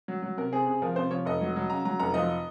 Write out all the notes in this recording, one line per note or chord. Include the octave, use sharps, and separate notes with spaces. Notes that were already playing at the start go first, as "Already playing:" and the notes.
F#3
F#3
C3 A#4
C4 G#4
C3 G#4
F3 A#4
C3 C5
F3 C#5
F1 D#5
F#3
F#3
C#3 A#5
F#3 A#5
F1 A#5
F3 D#5